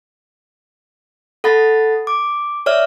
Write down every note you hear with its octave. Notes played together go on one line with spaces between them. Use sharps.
A4 F#5 B5 A6
D6
C#5 D5 E5 F6